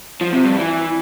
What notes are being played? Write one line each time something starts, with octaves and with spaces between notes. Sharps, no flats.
F3
C3
G2
E3